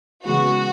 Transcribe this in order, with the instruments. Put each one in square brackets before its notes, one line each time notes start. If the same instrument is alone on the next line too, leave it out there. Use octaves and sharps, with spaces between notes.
[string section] C#3 E3 G#3 B3 F#4